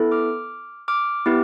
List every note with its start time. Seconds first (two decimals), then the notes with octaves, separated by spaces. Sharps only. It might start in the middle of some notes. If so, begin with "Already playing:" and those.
Already playing: B3 E4 A4
0.12 D6 F6
0.88 D6 F6
1.26 B3 E4 G4